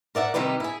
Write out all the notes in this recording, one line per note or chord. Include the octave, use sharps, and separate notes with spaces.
A#4 D5 E5 F#5
C3 D#3 G3 D#4 E4 B4
E4 G#4